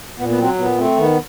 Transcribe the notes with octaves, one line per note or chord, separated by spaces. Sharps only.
A#2 B3
B3
F#3 C4
A#2 B3
A3 C4
D#3 B3